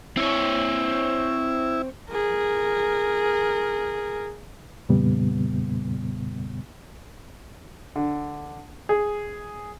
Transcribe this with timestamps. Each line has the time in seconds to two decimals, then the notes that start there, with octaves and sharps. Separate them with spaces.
0.17 C4 E4 C#5
2.10 G#4 A#4
4.89 F2 A#2 C#3 G3 B3
7.96 D3
8.89 G#4